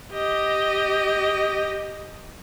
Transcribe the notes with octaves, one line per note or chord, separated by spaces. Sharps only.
G4 D#5